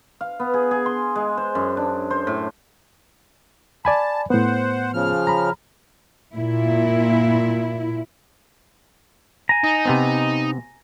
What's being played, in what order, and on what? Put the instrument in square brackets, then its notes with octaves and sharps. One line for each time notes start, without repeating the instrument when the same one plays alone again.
[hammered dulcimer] F5
B3
G#4
G#4
C6
G#3
C5
F#2
D4
C5
A2
[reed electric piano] D5 G#5 B5 [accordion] A5
[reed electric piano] A2 B3 [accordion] C5 F#5
[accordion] C#3 F3 F6
[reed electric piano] A#5 B5
[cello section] A#2 E4
[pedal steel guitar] G#5 A#5
[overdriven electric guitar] D#4
[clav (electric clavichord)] C3 B3 C4